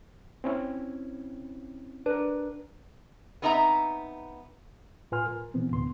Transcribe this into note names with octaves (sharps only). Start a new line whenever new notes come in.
C4 C#4 E4
D4 A#4 B4
B3 C4 D#4 E5 G#5 A#5
A2 F4 B4 G#5 C6 F6
A#4
B2 E3 B3 C4
D2 A2 B3 C6